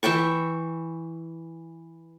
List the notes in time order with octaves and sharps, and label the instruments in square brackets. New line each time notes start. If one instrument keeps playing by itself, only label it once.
[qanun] E3 E5 G5 C#6